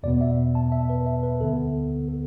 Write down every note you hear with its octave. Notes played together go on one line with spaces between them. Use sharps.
E2 B2 B3 D5
E5
A5
E5
B4
E5
B4
D2 D3 B3 A4
A4